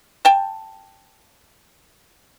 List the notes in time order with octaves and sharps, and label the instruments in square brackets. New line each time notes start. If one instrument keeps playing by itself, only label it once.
[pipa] G5 A5